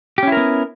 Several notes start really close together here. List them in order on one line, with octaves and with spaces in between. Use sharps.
G4 C#4 E4 A#4 B3